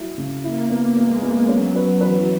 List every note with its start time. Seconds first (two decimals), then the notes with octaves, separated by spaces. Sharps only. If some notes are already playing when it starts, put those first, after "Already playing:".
Already playing: F#3 E4
0.18 C#3
0.43 A#3 E4
0.70 B3
0.97 G#3 B3
1.22 B3
1.48 F#3 C#4
1.75 B4
2.01 E3 B4